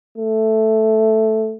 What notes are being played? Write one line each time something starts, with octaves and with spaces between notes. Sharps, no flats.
A3